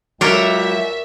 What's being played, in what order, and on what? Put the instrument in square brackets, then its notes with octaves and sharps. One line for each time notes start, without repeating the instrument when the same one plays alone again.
[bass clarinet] C#2 [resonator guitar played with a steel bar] F#3 [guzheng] A#4 C#5 D5 [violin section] E5